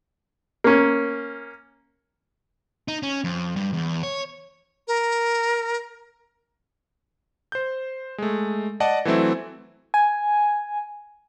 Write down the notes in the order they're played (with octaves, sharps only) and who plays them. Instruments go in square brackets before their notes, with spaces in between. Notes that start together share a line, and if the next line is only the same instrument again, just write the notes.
[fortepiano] A#3 C#4
[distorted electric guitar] D#4
C#4
F2
G2
E2
C#5
[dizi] A#4
[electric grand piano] C5 G6
G#3 A3
D5 D#5 F#5 A5
E3 F#3 A3 C4 E4
[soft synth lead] G#5